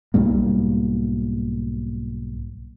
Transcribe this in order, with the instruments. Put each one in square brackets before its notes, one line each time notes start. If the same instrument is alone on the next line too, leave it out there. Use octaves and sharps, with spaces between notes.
[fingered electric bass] B1 G#2 G3 A#3